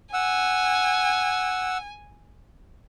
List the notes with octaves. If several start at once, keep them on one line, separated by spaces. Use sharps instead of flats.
F#5 G#5 E6